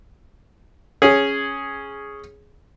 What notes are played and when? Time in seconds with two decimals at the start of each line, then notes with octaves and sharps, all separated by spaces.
1.02 C#4 G#4